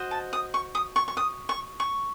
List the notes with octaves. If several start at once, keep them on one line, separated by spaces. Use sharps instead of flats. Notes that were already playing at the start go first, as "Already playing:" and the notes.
Already playing: F#4 C5 D#5
A5
D#6
C#6
D#6
C#6
C#6
D#6
C#6
C#6